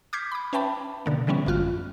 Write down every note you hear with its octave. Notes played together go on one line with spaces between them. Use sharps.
D6 F6 G6 G#6 B6 C7
B5 D6
C#4 B4 E5 G5 A5 B5
B2 D3 A#3
D3 E3 G3 B3 C#4
G#1 F#2 F4 F6 F#6